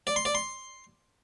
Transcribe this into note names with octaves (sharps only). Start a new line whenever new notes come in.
D5
C6
D5
C6